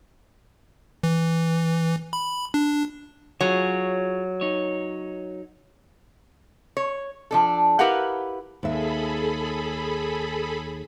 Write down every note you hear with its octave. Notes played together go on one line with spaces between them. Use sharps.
E3
B5
D4
F#3 F4 G#4 C#5
D#4 C#5
C#5
F3 D4 A4
E4 G4 A#4 B4 F5 F#5
D#2 G#4 A4 E5 B5